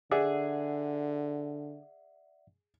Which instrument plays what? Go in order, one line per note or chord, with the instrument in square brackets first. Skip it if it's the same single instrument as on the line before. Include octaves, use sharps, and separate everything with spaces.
[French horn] D3 [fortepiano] G#4 [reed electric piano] D5 E5 F#5